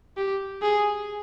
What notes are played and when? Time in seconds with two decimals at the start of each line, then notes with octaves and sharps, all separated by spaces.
0.17 G4
0.62 G#4